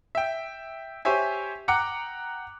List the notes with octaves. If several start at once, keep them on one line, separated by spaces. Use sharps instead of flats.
E5 G5
G4 C5 C#5 E5 G#5
F#5 G5 A#5 D6 F#6 C#7